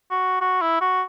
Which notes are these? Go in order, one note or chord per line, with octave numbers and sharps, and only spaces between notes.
F#4
F#4
E4
F#4